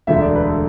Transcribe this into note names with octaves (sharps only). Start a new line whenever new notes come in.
E1 D2 D3 A3 E5
D5
B4
A4